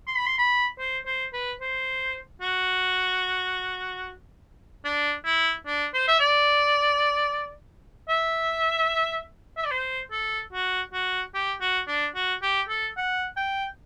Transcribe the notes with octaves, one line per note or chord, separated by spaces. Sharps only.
C6
B5
C6
B5
C5
C5
B4
C5
F#4
D4
E4
D4
C5
E5
D5
E5
E5
D5
C5
A4
F#4
F#4
G4
F#4
D4
F#4
G4
A4
F#5
G5